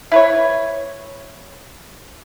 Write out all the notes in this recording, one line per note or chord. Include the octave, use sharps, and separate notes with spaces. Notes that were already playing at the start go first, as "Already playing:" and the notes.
E4 B4 C#5